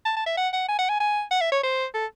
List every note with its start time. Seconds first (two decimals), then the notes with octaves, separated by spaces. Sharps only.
0.05 A5
0.16 A5
0.26 E5
0.37 F#5
0.53 F#5
0.69 G#5
0.78 F#5
0.89 G#5
1.00 G#5
1.31 F#5
1.41 E5
1.52 C#5
1.63 C5
1.94 A4